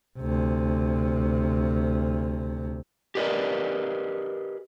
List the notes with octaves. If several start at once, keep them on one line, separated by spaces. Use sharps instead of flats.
D2 C3
G4 G#4 A#4 B4 D5 D#5